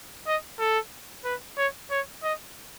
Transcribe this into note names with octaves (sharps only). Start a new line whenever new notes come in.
D#5
A4
B4
C#5
C#5
D#5